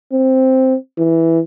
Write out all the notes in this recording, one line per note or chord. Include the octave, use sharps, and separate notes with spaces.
C4
E3